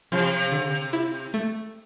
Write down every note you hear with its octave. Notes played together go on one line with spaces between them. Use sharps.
C3 F3
D3
E4
A3